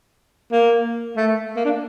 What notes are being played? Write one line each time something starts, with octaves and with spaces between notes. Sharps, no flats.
A#3
A3
A#3
D4